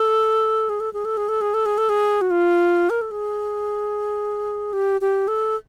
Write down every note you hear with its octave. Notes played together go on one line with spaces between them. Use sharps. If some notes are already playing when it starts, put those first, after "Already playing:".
Already playing: A4
G#4
A4
G#4
A4
G#4
A4
G#4
A4
G#4
A4
G#4
F#4
F4
A#4
A4
G#4
G4
G4
A4